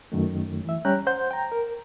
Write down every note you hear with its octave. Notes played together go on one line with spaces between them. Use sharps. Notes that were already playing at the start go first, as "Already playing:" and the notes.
F#2 D#3 A3
E3 E5
G3 C#4 G4 G5 A#5 F#6
C5 F#5 C6 G6
G5 A#5
A#4